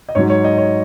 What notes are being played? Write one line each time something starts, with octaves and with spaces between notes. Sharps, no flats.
D#5
G#2 F#3 C#5
C#5
D#5
C#5